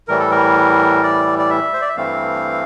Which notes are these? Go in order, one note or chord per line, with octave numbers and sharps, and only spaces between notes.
A2 E3 G3 A#4
A4
A#4
D5
D5
E5
C5
D5
E5
G2 E3 A3 C4 F5